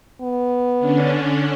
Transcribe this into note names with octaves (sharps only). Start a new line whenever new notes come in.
B3
D3 C#4 D4